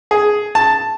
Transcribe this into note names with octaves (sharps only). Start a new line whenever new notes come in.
G#4
A5